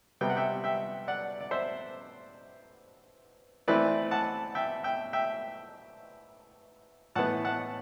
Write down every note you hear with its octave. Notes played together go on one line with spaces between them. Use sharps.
C3 G3 B3 G5
F#5
E5 G5
E5 G5
D5 F#5
D5
C5 E5
E3 A3 C4 B4 D5
F#5 A5
E5 G5
E5 G5
E5 G5
A2 E3 B3 F#5 A5
F#5 A5